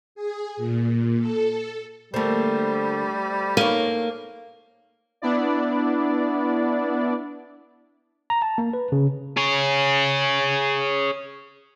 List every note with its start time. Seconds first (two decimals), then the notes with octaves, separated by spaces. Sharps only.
0.15 G#4
0.57 A#2
1.19 A4
2.14 D3 G3 A3 A#3 C5
3.57 A#3 D#4 C#5
5.22 B3 D4 E4 D5
8.30 A#5
8.42 A5
8.58 A#3
8.73 B4
8.92 C#3
9.37 G#4 C#5